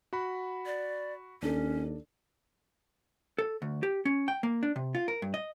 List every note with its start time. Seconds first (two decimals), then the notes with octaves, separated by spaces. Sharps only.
0.13 F#4 F#5 B5
0.66 D5
1.42 D#2 C#4 D4 A4
3.38 A4
3.62 D2
3.83 G4
4.05 C#4
4.28 G5
4.43 A#3
4.63 D4
4.76 C3
4.95 F4
5.08 A#4
5.22 G2
5.34 D#5